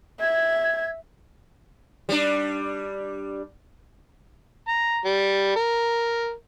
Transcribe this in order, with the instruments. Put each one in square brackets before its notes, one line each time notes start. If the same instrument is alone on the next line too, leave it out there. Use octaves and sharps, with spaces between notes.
[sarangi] E5 [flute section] G#6
[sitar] G3 D4
[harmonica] A#5
G3
A#4